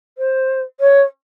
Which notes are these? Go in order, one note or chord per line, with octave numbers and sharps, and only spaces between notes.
C5
C#5